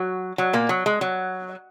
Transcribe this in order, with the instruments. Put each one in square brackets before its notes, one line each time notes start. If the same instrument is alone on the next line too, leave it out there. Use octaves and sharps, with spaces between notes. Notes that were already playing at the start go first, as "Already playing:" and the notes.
Already playing: [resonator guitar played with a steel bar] F#3
F#3
A#2 A#3
F#3
G#3
F#3